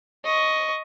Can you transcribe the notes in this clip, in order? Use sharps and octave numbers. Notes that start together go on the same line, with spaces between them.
D#5 C#6